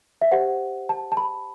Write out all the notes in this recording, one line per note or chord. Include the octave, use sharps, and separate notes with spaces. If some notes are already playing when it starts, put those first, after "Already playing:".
E5
G4 C5 F#5
A5
A5
B5